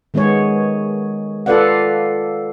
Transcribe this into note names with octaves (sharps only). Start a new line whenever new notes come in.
D#3 G#3 B3 G#4 C#5
F4 A4 B4 D5 F5 F#5